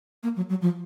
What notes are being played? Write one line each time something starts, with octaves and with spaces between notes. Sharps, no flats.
A#3
F#3
F#3
F3